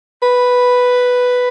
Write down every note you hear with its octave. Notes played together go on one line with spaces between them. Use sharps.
B4